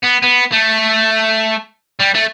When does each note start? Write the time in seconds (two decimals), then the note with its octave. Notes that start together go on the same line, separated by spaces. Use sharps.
0.04 B3
0.24 B3
0.53 A3
2.00 G3
2.15 A3